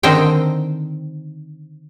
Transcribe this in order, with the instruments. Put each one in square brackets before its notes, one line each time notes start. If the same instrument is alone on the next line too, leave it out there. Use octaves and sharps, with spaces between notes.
[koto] D3 D#3 C4 D#4 C5 G5